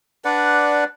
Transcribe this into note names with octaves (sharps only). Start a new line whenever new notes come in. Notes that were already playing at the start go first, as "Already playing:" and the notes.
D4 B4 D5 F#5